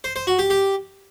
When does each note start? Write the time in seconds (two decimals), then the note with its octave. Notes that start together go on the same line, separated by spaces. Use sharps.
0.04 C5
0.16 C5
0.27 F#4
0.39 G4
0.50 G4